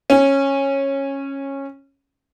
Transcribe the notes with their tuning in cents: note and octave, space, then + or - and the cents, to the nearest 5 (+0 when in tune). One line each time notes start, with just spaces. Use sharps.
C#4 -15